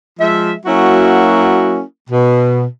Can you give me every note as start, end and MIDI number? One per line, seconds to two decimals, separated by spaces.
0.20 0.54 53
0.20 0.54 56
0.20 0.54 76
0.66 1.81 54
0.66 1.81 58
0.66 1.81 61
0.66 1.81 64
0.66 1.81 66
2.10 2.65 47